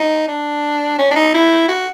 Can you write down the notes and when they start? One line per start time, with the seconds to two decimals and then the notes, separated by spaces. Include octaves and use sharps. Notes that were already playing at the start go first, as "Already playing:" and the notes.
Already playing: D#4
0.28 D4
0.98 C#4
1.11 D4
1.15 D#4
1.34 E4
1.68 F#4